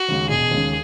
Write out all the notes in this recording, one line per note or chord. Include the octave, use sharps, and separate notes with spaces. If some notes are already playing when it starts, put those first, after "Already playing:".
Already playing: F#4
D#2 C#3 G#3 C#4
E1 G#4
D#2 C#3 G#3 C#4